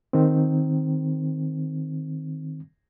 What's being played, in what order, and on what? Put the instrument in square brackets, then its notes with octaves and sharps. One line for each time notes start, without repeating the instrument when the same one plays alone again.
[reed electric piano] D#3 C4